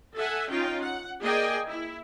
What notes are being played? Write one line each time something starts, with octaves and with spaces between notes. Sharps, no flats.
A4 E5 F#5 G#5
C#4 D#4 F4 G5
F#5
A#3 G#4 D5 D#5 G5 G#5
E4